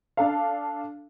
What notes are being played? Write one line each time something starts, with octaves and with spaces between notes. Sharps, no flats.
D4 A4 F5